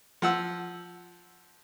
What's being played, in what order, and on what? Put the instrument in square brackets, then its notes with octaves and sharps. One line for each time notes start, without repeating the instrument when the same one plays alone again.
[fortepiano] F3 F#5 E6